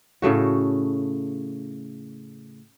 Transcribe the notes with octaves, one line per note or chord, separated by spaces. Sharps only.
A2 C#3 A3 F#4